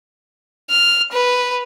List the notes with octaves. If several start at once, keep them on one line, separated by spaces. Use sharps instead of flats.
F6
B4